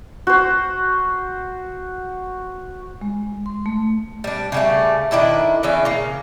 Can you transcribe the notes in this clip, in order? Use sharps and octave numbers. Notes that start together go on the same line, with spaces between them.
F#4 C5
G#3
C6
A3
G3 D4
C#3 G3 A3
D#3 D4 E4 A4
C#3 E3 C#4 D5
C#3 A#3